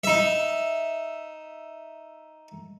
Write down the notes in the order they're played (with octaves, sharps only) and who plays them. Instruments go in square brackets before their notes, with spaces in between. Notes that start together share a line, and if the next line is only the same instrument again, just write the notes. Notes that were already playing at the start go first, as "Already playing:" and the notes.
[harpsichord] D#4 E5